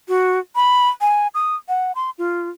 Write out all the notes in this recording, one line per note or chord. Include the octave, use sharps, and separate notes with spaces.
F#4
B5
G#5
D#6
F#5
C6
F4